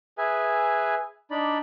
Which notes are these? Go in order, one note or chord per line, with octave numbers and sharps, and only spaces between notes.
G#4 B4 E5 G#5
D4 D#4 D5 B5